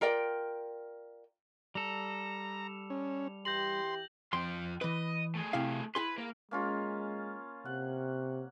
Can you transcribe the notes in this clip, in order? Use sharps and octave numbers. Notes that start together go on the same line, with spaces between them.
F4 A#4 D5 G5
G3 A4 A#5 F7
C#4
E3 G4 C6 G6 A#6 F#7
F2 F4 G5 C6
E3 B4 D#5
A3 G#4
C3 E4 F5
E4 G#4 B4 C6
A#3
G#3 A#3 C#4 F4
C3 F#5